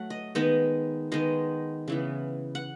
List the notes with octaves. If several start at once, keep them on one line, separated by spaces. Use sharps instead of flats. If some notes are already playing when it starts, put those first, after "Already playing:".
Already playing: F#3 A3 F#5
D#5
D#3 G#3 B3 D#5
D#3 G#3 B3 D#5
C#3 E3 B3
F#5